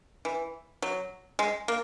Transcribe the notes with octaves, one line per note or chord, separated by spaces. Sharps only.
E3
F#3
G#3
A#3